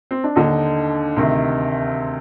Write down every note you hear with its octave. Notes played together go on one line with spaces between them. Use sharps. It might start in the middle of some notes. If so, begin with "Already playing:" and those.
C4
D4
D#2 D3 D#4
D2 C3 D#3